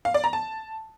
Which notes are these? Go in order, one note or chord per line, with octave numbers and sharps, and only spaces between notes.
F5
D5
A#5
A5